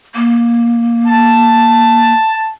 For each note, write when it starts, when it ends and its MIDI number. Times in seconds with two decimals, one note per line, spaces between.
0.15 2.12 58
1.07 2.51 81